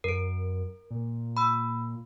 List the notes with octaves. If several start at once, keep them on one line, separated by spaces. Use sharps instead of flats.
F#2 A#4 D7
A#2
B5 E6